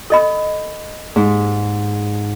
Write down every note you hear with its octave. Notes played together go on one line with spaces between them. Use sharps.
A4 D#5 B5
G#2